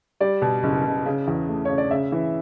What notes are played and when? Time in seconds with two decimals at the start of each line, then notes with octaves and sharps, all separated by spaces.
0.21 G3 D5
0.42 B2
0.63 F#1
0.84 F#1
1.06 C#3
1.27 E2
1.49 A3
1.65 C#3 C#5
1.78 D5
1.91 C#3 E5
2.12 E3